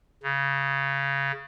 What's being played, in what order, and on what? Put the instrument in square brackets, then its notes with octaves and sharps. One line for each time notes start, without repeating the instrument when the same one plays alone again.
[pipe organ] C#3